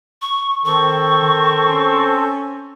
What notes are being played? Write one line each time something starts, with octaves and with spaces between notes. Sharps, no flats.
C#6
D#3 C4 A4 C#6
D#3
C#4